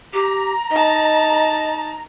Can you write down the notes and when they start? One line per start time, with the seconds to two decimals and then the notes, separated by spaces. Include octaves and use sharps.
0.13 G4 A#5
0.71 D#4 D#5 A5